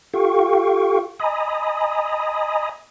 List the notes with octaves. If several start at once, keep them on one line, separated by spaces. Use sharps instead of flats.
F4 G4 A4 F5 G5 C#6
D#5 G#5 A#5 B5 D#6